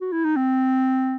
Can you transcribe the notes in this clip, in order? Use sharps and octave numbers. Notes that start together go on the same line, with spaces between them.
F#4
E4
D#4
C4